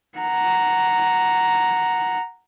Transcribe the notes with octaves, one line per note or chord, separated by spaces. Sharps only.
F#5 A#5